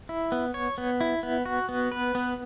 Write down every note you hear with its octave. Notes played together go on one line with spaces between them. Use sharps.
E4
B3
C#5
B3
E4
B3
F#4
B3
B4
B3